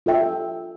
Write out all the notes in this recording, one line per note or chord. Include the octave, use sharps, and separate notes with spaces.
F4 A4 E5 G5